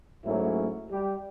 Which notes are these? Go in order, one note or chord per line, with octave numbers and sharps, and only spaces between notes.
G#2 F#3 A3 A#3 C#4 E4
G3 G4